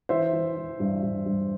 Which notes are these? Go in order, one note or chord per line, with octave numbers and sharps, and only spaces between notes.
E3 C5 E5
E3
E3
G2
G2
G2